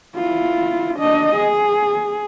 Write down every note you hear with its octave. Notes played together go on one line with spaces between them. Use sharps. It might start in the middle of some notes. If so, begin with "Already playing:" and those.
E4 F4
D4 D#5
G#4